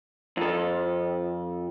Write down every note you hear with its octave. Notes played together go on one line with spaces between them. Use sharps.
F2 A4